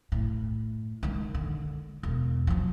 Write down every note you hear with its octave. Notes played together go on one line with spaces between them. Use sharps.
A2
D#3 G#3
D3
E1
F3 F#3